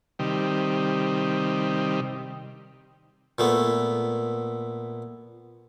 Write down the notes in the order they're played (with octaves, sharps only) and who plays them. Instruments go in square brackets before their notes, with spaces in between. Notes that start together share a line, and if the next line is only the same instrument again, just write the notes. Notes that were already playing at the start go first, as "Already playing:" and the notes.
[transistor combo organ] C3 D#3 G3
[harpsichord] A#2 A3 B3